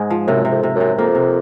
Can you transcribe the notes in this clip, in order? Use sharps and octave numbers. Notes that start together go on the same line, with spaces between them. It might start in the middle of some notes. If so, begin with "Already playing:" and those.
Already playing: G#2 G#3
F3
F#2 C3
C3
F2
C3
F#2
C3
F2 A#3
C3